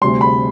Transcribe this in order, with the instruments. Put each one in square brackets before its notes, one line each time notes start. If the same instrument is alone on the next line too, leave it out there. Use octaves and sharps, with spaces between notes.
[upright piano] D2 C3 G3 C6
B5